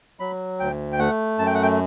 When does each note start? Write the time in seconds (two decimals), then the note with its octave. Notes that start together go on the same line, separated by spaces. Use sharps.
0.20 F#3 B5
0.60 D2 G5
0.92 G5
0.99 A3 F#5
1.38 F#2 A5
1.46 G5
1.54 F#5
1.63 G5